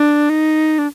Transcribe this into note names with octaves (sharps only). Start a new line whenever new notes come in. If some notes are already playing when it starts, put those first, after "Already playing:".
Already playing: D4
D#4
D4